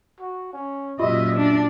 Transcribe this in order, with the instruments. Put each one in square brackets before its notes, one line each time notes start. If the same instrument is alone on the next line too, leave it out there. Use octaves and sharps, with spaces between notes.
[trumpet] F#4
C#4
[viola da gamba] F#2 A#2 [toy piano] F4 G4 [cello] D#5 [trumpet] E5
[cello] D4